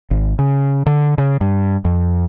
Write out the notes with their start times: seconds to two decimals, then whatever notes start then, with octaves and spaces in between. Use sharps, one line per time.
0.11 G#1
0.39 C#3
0.86 D3
1.18 C#3
1.41 G2
1.85 F2